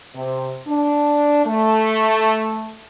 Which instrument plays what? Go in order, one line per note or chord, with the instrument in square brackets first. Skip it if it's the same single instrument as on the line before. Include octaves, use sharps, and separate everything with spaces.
[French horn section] C3
D4
A3